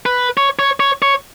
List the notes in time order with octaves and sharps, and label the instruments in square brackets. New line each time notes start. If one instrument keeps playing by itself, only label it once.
[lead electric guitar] B4
C#5
C#5
C#5
C#5